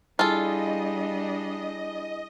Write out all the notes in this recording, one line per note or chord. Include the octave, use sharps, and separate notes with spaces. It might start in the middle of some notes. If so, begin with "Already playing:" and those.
G3 D4 E4 F4 G#4 A4 D#5 G#5